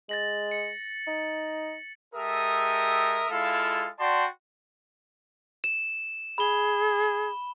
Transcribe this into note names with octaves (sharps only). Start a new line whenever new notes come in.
G#3 A6 A#6 F#7
C#7
D#4
G#3 G4 A4 A#4 E5 D#6
G#3 E4 F4 A4 F5
F#4 D5 G5 A5 C6
E7
G#4 B5 G7